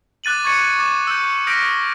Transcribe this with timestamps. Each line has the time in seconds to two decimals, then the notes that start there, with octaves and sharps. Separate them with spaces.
0.24 D6 F#6 A6 D#7 F#7
0.44 C#6 G#6 A6 C#7
0.79 D6 A6 E7
1.07 E6 G6
1.47 D#6 F6 G6 A#6 B6 D7